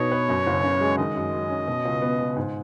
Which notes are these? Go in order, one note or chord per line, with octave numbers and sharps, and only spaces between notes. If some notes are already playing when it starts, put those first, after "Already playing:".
Already playing: B2 B3 D#4 C#5
B4
F#2
F#1
C#3
G#3
D#3 D#5
F#2
F#3
C#4
B2
C#2
B3
C#2
G#2